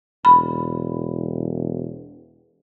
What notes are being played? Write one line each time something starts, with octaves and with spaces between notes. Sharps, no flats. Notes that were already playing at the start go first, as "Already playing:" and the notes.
E1 B5